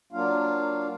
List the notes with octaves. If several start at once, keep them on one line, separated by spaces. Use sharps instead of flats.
F#3 A#3 D4 F4 F5